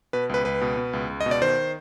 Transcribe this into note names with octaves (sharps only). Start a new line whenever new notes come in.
B2 B4
C#2 B4
C#2 B4
B2
B2
C#2
C#2
D#5
B2
D5
D#3 C5